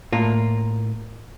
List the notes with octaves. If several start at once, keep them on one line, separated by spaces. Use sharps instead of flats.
A2 A#3 F4